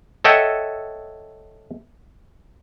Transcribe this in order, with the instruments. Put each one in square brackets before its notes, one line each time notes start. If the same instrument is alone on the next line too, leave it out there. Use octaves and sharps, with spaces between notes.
[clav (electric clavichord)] A4 C#5 D#5 E5 F#5 G5